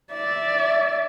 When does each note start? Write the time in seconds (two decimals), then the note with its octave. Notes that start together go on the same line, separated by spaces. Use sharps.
0.12 D5 E5